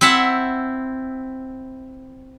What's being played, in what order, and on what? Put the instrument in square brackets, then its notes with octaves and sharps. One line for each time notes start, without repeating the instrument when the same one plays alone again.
[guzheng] C4 E4 E5 F#5 A5